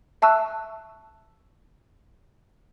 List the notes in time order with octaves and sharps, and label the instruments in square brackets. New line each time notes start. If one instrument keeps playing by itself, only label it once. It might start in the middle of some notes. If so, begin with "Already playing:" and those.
[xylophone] E5 A5 C#6 E6 F#6